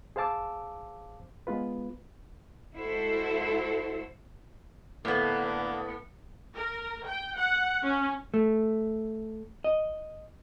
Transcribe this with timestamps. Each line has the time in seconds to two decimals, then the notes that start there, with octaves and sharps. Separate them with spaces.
0.16 G#4 C5 F5 A5 D6 E6
1.47 G#3 B3 F4 B4
2.76 G#3 E4 F#4 A4 C5
5.05 A2 D3 A#3 B3
6.55 A#4
7.06 G5
7.37 F#5
7.83 C#4
8.34 A3
9.64 D#5